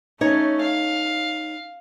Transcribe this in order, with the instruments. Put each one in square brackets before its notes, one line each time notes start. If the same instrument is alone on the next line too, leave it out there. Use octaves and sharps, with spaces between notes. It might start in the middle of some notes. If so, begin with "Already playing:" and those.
[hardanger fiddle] A3 C#4 [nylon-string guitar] D#4 C#5
[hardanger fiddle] F5